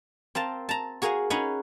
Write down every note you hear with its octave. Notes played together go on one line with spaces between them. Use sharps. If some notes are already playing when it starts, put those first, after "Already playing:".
C4 A#4 F5 A5
A5 A#5
F#4 G#4 A#4 F5 G#5
C#4 D#4 G#4 B4 F#5 G#5